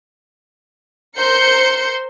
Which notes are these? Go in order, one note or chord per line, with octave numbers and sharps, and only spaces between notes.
A#4 C5 C6 G6 C#7